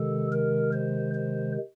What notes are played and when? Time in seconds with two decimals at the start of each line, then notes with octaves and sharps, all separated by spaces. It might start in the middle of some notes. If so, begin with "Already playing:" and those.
Already playing: C3 D#3 G#3 A4
0.32 A#4
0.73 C5
1.15 C5